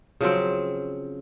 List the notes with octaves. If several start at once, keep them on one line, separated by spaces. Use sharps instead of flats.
C#3 F3 F#3 C4